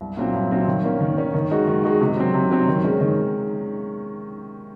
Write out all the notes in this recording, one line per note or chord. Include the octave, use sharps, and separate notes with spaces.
C2
A#2 F#3 C4
C2
A#2 F#3 C4
D#3
A#3 C#4
D#3
A#3 C#4
D#3
G#3 D#4 F#4
D#3
G#3 D#4 F#4
C3
F#3 C4
C3
F#3 C4
D#3
G#3 C#4
D#3